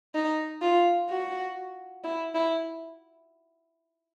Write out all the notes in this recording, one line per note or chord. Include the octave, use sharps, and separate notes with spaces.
D#4
F4
F#4
E4
E4